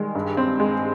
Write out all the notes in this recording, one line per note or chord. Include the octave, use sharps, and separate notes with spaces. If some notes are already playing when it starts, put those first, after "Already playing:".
Already playing: D#3 G3 G#3
G2
C4
G#3